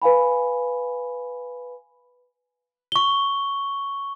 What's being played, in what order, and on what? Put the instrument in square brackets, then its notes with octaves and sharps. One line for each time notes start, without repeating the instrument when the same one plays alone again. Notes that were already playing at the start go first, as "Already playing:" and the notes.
[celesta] B4 F5 G#5 B5
[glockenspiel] C#6 G7